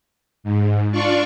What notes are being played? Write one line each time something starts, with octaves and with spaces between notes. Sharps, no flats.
G#2
D4 F4 D5 C#6